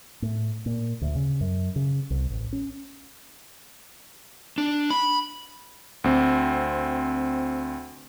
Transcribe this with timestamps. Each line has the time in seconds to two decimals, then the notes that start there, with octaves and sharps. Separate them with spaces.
0.22 A2
0.66 A#2
1.01 D2
1.15 C#3
1.41 F#2
1.76 C#3
2.10 C2
2.30 A1
2.53 C#4
4.58 D4
4.90 B5
6.04 D2 C4